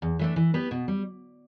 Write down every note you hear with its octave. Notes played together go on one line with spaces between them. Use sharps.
E2
E3 A3 D4
E3
B3 G4 B4
B2
G3